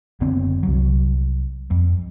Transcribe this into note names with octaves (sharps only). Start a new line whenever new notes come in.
F#1 D3 B3 C4
C2 F#3
F2